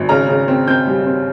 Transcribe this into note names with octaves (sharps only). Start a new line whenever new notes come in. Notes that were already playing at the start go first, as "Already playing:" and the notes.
Already playing: G#1
C#3 A#5
C#3
C4
C4 G6
G3
C4